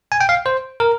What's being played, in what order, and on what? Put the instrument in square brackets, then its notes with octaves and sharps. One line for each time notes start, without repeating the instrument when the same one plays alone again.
[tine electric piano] G#5
G5
F5
C5
A#4